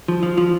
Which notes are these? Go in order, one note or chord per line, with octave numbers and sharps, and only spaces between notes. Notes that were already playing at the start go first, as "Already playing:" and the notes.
F3
F3
F3